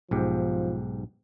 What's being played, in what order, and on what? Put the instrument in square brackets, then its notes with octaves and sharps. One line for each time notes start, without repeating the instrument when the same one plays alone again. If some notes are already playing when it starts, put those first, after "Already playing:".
[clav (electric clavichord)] B1 G#2 G4 [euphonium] F3